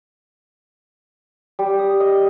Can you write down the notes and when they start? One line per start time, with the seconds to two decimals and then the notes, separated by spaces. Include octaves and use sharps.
1.59 G3
1.79 D#6
2.00 D#5